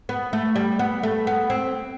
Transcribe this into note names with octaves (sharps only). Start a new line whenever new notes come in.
B3
A3
G3
B3
A3
B3
C4